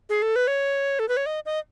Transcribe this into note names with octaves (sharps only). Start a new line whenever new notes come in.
G#4
A4
B4
C#5
A4
B4
C#5
D#5
D#5